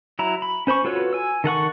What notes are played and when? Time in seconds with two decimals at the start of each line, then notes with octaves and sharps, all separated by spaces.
0.19 F#3 E4 A#5
0.42 B5
0.67 C#4 C5 B5 C#6
0.85 F4 F#4 A4 B4 C#5
1.13 G#5 E6
1.44 D#3 A4 F#5 C#6